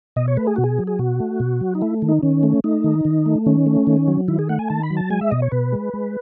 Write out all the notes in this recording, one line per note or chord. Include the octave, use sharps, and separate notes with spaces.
B2 D#5
C#5
A3 B4
G#4
B2 F#4
G#4
F#3
G#4
B2 F#4
A3
B2
F#3
D#4
A3 E4
D#3
D#4
D#3 C#4
A3
A3 D#4
D#3
D#3
A3
D#3 C#4
A3
D#3
F#3
D#3 E4
G#4
A3 F#5
G#5
D#3 A5
B5
F#3
A5
G#3 G#5
E5
B2 D#5
C#5
B2 B4
G#3
G#3